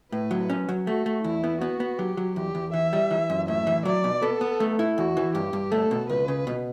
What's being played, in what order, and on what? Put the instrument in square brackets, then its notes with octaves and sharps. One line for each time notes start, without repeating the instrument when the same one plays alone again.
[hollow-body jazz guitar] A2 [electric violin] B4
[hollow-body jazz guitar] F#3
C#4
F#3
[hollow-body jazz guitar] A3 [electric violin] F#4
[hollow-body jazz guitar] A3
[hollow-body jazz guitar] E2 [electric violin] E4
[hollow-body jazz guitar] B3
[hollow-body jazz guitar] B3 [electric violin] F#4
[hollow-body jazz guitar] B3
[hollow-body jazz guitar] F#3 [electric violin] G4
[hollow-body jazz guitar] F#3
[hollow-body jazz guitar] E2 [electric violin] G4
[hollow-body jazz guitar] E2
[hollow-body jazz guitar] E3 [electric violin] E5
[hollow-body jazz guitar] G3
E3
F#2
[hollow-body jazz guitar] A2 [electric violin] E5
[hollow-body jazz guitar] E3
[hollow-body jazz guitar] F#3 [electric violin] D5
[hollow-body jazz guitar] B2
[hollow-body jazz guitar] B3 [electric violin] A4
[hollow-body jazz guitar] B3
A3
E4
[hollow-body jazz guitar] E2 [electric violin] F#4
[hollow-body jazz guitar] E3
[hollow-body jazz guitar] G2 [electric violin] G4
[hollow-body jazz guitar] G2
[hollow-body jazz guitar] A3 [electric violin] A4
[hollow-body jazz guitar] B2
[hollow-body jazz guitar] C#2 [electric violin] B4
[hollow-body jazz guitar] C#3
B2